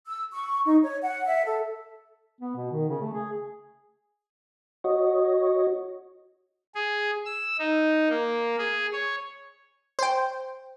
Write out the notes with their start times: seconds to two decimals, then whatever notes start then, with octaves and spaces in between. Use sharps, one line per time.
0.07 E6
0.33 C#6
0.66 D#4
0.83 C#5
1.02 F#5
1.26 E5
1.45 A4
2.40 B3
2.56 B2
2.71 D#3
2.89 C#3
3.01 A3
3.13 G#4
4.84 F#4 C#5 D#5
6.75 G#4
7.25 E6
7.59 D#4
8.09 A#3
8.58 G#4
8.93 C#5
9.99 C5 G5